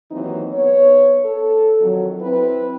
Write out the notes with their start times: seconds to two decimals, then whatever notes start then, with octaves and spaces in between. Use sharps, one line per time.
0.11 D#2 E3 F#3 C4 D#4
0.53 B3 C#5
1.25 A4
1.80 F2 D#3 F#3
2.22 C4 E4 B4